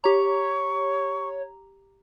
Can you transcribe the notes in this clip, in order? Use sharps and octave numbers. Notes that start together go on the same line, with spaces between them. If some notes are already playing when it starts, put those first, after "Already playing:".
G4 C#5 A#5 C#6